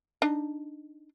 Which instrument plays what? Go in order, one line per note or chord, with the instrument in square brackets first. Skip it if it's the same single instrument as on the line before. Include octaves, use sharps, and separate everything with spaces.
[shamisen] D4 D#4